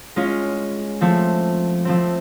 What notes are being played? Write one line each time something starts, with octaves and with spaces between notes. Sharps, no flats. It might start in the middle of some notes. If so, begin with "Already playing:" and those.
G#3 C#4 F4
F3 A3 C4
F3 A3 C4